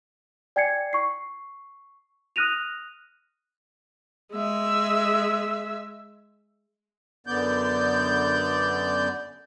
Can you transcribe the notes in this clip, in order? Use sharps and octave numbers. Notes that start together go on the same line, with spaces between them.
D5 G5 G#5 G#6 C7 C#7
C#6 C7
D#6 F6 F#6 A#6 D#7 F7
G#3 E5
F#2 D3 B3 D5 G6